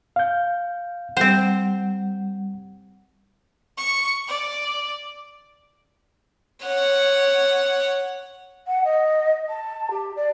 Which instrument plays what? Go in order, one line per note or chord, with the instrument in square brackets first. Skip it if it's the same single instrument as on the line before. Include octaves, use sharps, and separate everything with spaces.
[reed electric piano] F5 G6
[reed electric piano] G3 F#5 [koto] C4 C5
[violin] C#6
D5
C#5 F#5
[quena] F#5
D#5
A5
G4
D5